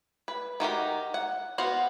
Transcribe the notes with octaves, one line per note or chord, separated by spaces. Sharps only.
B4
D#3 F#4 G4 A#4
F#5
B3 F#4 C5 F5 F#5